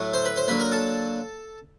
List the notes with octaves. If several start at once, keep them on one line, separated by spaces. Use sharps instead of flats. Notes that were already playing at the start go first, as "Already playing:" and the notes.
Already playing: A2 F#3 A3
C5 C6
B4 B5
C5 C6
D3 F#3 A#3 B4 B5
A#4 A#5
A4 A5